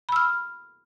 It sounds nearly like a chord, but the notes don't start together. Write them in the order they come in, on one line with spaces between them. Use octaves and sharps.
B5 E6 F6